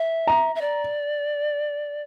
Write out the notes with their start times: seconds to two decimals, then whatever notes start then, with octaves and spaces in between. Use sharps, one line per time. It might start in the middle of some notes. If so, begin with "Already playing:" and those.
Already playing: E5
0.27 A#5
0.55 E5
0.61 D5